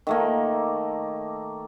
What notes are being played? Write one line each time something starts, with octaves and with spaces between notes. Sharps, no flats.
D#3 A3 A#3